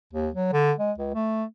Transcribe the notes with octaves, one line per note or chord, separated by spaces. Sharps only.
D#2
F#3
D3
G#3
C#2
A3